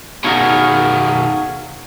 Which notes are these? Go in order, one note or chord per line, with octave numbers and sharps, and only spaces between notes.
B2 D#3 G#4 A#4 C#5 F5 F#5 C#6